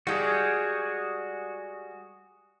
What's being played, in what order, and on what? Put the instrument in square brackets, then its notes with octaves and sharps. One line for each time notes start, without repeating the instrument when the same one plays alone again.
[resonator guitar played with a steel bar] G3 G#3 [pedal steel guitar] F#4 G#4